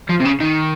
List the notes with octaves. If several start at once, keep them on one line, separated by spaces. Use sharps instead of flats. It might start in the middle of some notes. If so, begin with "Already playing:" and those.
F3
C3
C#3
D#3